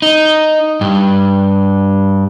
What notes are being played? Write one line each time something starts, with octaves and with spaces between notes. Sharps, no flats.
D#4
G2